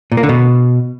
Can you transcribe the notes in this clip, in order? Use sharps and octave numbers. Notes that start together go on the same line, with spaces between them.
A#2
A#3
D3
B2